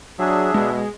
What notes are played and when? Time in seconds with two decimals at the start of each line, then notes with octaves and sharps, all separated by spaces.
0.19 F#3 D4 G#4 E5
0.54 B2 G#3